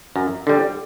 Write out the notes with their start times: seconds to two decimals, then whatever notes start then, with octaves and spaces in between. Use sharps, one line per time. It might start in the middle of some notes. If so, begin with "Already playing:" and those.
0.16 F#2
0.47 D3 G3